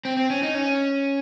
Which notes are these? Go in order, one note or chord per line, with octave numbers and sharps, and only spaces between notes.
C4
C4
C#4
D#4
C#4